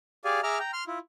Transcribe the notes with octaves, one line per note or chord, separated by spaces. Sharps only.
G4 G#4 D5 F5 G#5
G#4 E5 A#5 D6 F6
G5 A#5
C6 F6
E4 F4